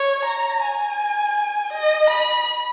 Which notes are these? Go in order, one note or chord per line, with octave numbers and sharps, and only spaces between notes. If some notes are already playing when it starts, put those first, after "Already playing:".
Already playing: C#5
A#5
G#5
D#5
B5